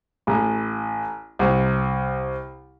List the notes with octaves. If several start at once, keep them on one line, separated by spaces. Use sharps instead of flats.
A1
C2